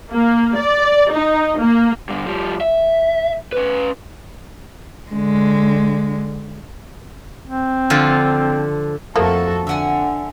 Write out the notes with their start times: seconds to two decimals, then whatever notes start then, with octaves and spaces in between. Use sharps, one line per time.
0.11 A#3
0.56 D5
1.12 D#4
1.59 A#3
2.09 G2 D3
2.26 F3 G3
2.61 E5
3.52 C#4 B4
5.12 D3 G#3
7.47 C4
7.90 D3 F3 F4
9.16 F2 F3 A3 A#3 F#4 A4
9.67 D3 E5 F#5 G#5